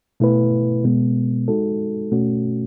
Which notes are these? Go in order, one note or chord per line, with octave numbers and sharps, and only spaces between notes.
B2 A3 E4 B4
B2 G#3 B3
G#3 D#4 F#4 A4
B2 A3 C#4 F#4